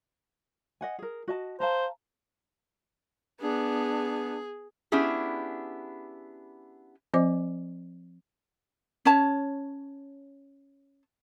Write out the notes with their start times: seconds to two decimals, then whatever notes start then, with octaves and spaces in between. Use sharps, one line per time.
0.81 D#5 F#5 G#5
0.99 G#4 A#4
1.28 F#4 D#5 A5
1.60 C5 F5 A5 A#5
3.41 B3 D4 G#4
4.92 B3 C#4 D4 E4 G4 G#4
7.14 F3 C4 C5 D#5 D6
9.05 C#4 C#5 A5